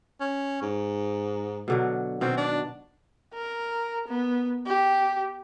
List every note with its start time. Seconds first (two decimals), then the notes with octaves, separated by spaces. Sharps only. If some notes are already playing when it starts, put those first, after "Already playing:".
0.20 C#4
0.62 G#2
1.68 B2 D3 F#3
2.21 B2 D#3 C4 F#4
2.37 D4
3.34 A#4
4.08 B3
4.66 G4